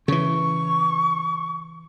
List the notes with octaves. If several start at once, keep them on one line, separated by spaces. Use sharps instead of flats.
C#3 E3 C#6